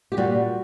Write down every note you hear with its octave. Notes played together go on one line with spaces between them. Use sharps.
G4
A#2 G3 F#4